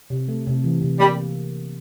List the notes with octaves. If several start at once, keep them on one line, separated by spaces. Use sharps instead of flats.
C3
A3
C3
E3
C3
G3 A#3